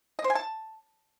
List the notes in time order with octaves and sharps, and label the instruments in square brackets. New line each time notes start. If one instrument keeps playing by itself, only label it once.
[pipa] D#5
C5
G#5
A5